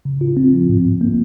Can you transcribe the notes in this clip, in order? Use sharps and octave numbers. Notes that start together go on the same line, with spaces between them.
C#3
F4
C4
F3
G#2
G#2
A#3